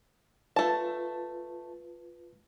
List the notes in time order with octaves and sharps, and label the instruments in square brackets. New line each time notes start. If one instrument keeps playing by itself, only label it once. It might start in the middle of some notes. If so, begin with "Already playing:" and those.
[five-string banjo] A3 A5 [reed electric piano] F4 B4